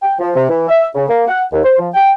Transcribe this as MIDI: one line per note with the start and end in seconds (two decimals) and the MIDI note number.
0.02 0.14 79
0.19 0.30 53
0.35 0.46 48
0.49 0.67 52
0.69 0.85 76
0.95 1.05 49
1.09 1.23 58
1.27 1.43 78
1.52 1.62 39
1.63 1.78 72
1.79 1.89 53
1.94 2.11 79